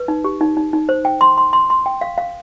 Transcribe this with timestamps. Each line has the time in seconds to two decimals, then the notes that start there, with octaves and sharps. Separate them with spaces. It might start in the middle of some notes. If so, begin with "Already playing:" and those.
Already playing: B4
0.08 D#4
0.24 G4
0.41 D#4
0.57 D#4
0.73 D#4
0.89 C5
1.05 G5
1.21 C6
1.38 C6
1.53 C6
1.70 C6
1.86 G5
2.01 F5
2.18 F5